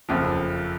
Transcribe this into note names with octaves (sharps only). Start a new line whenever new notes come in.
F#1 F2 F3